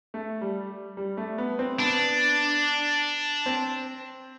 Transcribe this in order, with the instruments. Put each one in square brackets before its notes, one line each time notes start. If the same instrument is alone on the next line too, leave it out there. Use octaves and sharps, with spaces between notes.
[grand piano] A3
G3
G3
A3
B3
C4
[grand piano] B3 [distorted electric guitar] D4
[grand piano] C4